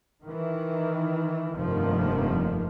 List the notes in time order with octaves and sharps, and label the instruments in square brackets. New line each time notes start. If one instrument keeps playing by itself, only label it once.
[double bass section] D#3 E3
F1 G2 D#3 F3 A#3